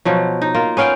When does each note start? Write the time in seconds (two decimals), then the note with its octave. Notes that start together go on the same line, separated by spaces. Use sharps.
0.05 B2 F3 F#3
0.42 D#4
0.54 A#3 F4
0.77 B3 C#4 F5 G5